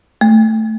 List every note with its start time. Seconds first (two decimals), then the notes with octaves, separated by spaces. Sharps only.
0.21 A3